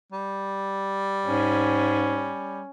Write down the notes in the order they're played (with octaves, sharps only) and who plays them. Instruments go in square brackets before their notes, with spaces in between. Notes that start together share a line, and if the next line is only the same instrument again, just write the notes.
[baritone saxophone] G3
[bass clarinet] G#2 [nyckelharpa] C#4